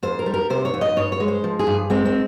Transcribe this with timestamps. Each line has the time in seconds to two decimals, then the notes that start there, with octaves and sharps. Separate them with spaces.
0.03 F2 C5
0.19 A#4
0.26 G3
0.34 A#4
0.50 C3 C5
0.65 C#5
0.74 F2
0.81 D#5
0.96 G2 C#5
1.12 C#5
1.20 G#3
1.28 C5
1.44 F3
1.59 G#4
1.67 G2
1.90 G#3 C4
2.05 C4